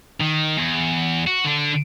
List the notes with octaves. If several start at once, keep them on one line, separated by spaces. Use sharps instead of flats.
D#3
E2
F#4
D3 D4